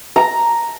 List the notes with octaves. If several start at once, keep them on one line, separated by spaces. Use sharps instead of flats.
A#5